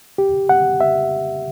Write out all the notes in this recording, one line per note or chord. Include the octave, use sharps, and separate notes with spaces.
G4
F#5
E5